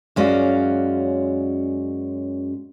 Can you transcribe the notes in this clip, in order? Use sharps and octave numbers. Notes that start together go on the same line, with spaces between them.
F#2 G#3 C#4 F#4 D5 F5